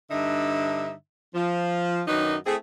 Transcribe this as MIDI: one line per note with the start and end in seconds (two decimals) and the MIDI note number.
0.11 0.92 43
0.11 0.92 50
0.11 0.92 63
0.11 0.92 76
1.35 2.02 53
2.07 2.36 42
2.07 2.36 51
2.07 2.36 54
2.07 2.36 62
2.07 2.36 63
2.07 2.36 71
2.47 2.56 57
2.47 2.56 60
2.47 2.56 64
2.47 2.56 68